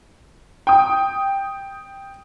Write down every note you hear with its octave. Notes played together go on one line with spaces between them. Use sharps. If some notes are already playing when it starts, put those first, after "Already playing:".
G5 D#6